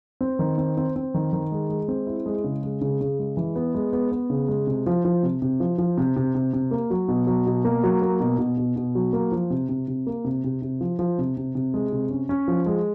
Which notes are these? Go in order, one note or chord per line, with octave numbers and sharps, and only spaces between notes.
C4
D#3
C4
C4
C4
D#3
D#3
G#3
G#3
C4
E4
G#3
C#3
G#3
C#3
C#3
G#3
E3
B3
G#3
B3
B3
C#3
G#3
C3
F3
F3
C3
C3
F3
F3
C3
C3
C3
C3
A#3
F#3
B2
F#3
B2
A#3
F#3
A#3
B2
B2
B2
B2
F#3
A#3
F3
C3
C3
C3
A#3
C3
C3
C3
F3
F3
C3
C3
C3
G#3
C3
C#4
C#4
F3
G#3